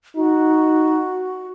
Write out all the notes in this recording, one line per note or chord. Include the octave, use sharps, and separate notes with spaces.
D#4 F#4